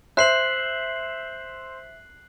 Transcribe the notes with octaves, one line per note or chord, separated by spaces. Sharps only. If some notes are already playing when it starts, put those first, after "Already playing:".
C5 E5 F#6 C7 F#7